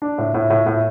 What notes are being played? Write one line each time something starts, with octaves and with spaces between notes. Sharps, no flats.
D4
A2
A2
A2
A2